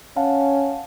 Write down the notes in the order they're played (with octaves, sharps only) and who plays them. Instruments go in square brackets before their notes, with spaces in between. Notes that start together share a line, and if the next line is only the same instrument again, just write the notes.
[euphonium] C#4 [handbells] F5 F#5 A5